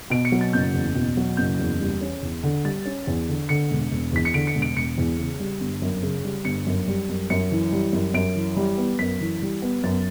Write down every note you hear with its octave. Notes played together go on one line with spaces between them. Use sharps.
B2 D7
C#7
F#3
A6
F#1 G6
E2
B2
F#3
F#1 G6
E2
G3
C#4
E2
D3
G3 A6
C#4
E2
D3
D3 C#7
E1
E1
E2 B6
C#7
D3 D7
C#7
E1
D7
E1 C#7
E2
C#3
G3
G1
F#2
C#3
G3
G1 C#7
F#2
G3
F#2
F#2 C#7
E3
G3
F#2
F#2 D7
E3
G3
B3
F#2 B6
E3
G3
B3
F#2 A6